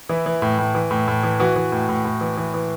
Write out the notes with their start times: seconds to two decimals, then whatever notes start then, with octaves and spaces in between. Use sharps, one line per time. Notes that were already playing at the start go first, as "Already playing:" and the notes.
0.09 E3 E4
0.26 E3
0.42 A2
0.58 A2
0.75 E3
0.91 A2
1.08 A2
1.23 E3
1.40 E3 F#4
1.56 E3
1.72 A2
1.89 A2
2.05 A2
2.21 E3
2.37 E3
2.54 E3